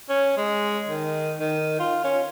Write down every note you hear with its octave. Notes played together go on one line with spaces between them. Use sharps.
C#4
G#3
D#3
D#3
F4
C#4